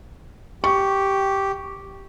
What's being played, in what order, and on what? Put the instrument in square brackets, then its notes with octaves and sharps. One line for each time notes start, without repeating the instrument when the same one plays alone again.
[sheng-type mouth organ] G4 [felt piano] C#6